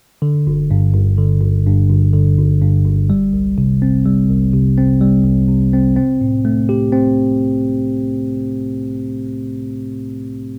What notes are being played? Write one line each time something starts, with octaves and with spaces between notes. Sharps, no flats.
D3
G1
G2
G1
D3
G1
G2
G1
D3
G1
G2
G1
G3
C2
C3
C4
G3
C2
C3
C4
G3
C2
C3
C4
C4
A2
A3
G4
C4